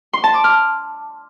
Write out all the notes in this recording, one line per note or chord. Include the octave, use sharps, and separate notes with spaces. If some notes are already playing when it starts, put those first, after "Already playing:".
C6
A5
D6
F6